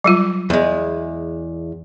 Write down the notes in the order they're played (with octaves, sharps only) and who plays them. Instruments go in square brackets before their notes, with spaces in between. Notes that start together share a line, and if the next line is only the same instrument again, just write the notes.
[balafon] F#3 G3 F4
[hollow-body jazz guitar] E2 G#3